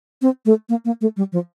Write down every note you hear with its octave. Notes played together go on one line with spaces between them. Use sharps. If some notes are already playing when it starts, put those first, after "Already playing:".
C4
A3
A#3
A#3
A3
G3
F3